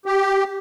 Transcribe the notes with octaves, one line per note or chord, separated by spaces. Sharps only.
G4